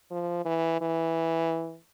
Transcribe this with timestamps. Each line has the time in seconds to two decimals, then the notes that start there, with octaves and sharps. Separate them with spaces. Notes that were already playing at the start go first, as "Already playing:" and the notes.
0.11 F3
0.45 E3
0.81 E3